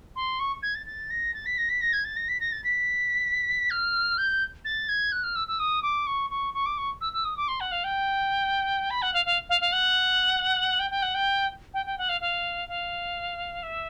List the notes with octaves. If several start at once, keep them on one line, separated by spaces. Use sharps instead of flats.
C6
C#6
G#6
A6
A6
A#6
A6
B6
A#6
B6
A#6
G#6
A6
A#6
B6
A#6
A6
B6
F6
G6
A6
G#6
F#6
F6
E6
E6
D#6
D6
C#6
C#6
C#6
D6
C#6
E6
E6
D#6
D6
C6
F#5
F5
G5
B5
F#5
F5
F5
F5
F5
F#5
G5
G5
F#5
G5
G5
G5
F#5
F5
F5
F5
E5